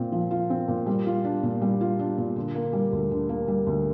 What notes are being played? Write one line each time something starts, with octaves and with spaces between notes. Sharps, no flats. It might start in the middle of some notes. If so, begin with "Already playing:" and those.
Already playing: A#2 C4 F4
F3
F4
C4
A#2
G3
F4
D4
A#2
G3
F4
D4
A#2
D3
A#3
G3
D2
D3
A#3
G3
D2